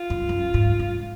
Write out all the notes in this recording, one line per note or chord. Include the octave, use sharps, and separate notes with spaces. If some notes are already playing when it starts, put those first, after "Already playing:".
Already playing: F4
F#2
F#2
G#2
G#2